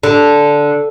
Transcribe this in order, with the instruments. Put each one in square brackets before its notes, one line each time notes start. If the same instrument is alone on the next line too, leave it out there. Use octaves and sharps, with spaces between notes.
[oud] D3